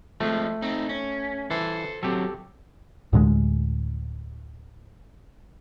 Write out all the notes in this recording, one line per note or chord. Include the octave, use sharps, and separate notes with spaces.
F3 G#3 A3 C4
C4 D#4
C#4
E3 A4 C5
F#3 C4 G4 A4
D2 A2 D3 G#3